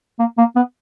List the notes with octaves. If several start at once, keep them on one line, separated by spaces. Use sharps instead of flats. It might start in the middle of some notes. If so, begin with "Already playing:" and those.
A#3
A#3
B3